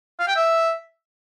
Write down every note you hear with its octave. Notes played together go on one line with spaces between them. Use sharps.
F5
G5
E5